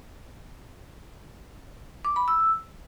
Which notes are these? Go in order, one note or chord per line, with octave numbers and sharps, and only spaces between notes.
D6
B5
E6